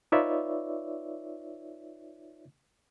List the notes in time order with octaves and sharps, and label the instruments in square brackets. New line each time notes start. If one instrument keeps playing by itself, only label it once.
[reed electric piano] D#4 F4 B4 C#5 D5 E5